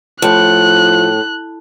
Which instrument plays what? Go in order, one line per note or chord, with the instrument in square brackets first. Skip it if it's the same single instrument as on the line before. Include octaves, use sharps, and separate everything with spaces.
[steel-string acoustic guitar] A2 [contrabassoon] F3 [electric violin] F#6